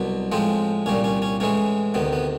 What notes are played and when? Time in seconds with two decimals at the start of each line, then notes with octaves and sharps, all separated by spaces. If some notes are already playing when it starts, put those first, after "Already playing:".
Already playing: C2 B2 F#3
0.32 A2 F3 G#3 C4
0.86 C2 A#2 G3 C#4
1.04 C#4
1.22 C#4
1.40 A2 E3 G#3 C#4
1.94 D2 C3 D#3 B3
2.13 B3